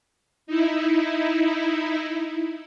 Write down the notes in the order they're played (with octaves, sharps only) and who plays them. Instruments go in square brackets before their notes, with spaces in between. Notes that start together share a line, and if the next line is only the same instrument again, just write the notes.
[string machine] D#4 E4